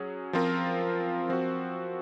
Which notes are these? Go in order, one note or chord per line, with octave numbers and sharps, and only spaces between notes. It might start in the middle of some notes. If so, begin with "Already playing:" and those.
Already playing: F#3 C#4 G#4
F3 C4 F4 A#4
F3 C4 F#4